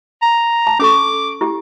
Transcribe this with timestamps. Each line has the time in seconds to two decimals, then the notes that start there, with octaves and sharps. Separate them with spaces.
0.22 A#5
0.67 A5
0.79 C#4 A4 C#6 D6
1.41 E4 G4